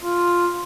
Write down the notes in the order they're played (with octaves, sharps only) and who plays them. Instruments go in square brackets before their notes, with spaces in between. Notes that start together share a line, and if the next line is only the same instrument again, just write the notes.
[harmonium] F4